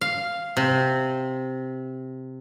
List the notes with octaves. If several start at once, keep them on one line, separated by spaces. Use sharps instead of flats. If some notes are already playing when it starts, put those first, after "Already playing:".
F5
C3